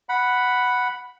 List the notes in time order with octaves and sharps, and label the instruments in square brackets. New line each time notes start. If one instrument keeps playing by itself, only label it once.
[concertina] F#5 B5